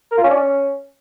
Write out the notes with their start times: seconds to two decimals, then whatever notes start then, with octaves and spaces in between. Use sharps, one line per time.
0.11 A#4
0.18 F4
0.24 C#4
0.30 D4
0.36 C#4